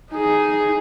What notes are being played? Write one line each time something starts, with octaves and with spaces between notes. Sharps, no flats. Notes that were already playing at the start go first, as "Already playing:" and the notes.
D#4 G#4